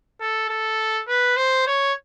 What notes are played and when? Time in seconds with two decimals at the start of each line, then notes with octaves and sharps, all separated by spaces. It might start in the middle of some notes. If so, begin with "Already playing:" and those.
0.21 A4
0.49 A4
1.08 B4
1.37 C5
1.67 C#5